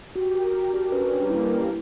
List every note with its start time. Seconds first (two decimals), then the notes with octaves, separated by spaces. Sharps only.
0.15 F#4 G4
0.35 A#4
0.53 F#4 G4
0.73 D4
0.92 C#4 B4
1.20 G3
1.30 A#3 E4
1.63 A#3